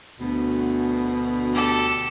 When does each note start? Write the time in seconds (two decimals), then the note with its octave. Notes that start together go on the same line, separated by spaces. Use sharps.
0.19 D2 B2
1.53 G4 A4